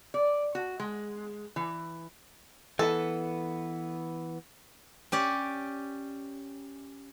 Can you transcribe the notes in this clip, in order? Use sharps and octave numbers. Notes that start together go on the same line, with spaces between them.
D5
F#4
G#3
E3
E3 B3 A4
C#4 G4 D5